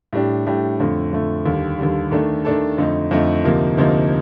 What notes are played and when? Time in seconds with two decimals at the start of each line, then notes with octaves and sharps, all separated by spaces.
0.13 A2 G3 D4 G4
0.47 A2 G3 D4 G4
0.80 F2 D3 A3
1.13 F2 D3 A3
1.46 D#2 D3 G3
1.79 D#2 D3 G3
2.11 D#3 A3 D4 A4
2.45 D#3 A3 D4 A4
2.78 F2 D3 A3 D#4
3.11 F2 D3 A3 D#4
3.44 D2 C3 F3 A#3 D#4
3.77 D2 C3 F3 A#3 D#4